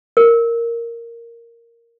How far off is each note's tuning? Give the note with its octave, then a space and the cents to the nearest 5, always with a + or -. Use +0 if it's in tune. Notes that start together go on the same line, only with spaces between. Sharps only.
A#4 -5